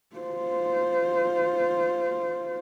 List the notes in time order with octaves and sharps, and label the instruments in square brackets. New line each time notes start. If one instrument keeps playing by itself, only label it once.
[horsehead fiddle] F4 C5